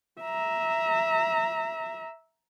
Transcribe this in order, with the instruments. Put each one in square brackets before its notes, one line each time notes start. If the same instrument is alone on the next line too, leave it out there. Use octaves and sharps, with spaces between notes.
[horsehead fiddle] E5 A#5